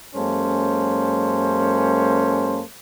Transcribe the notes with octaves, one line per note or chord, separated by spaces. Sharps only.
F#2 G#3 A#3 C#4 A4 C5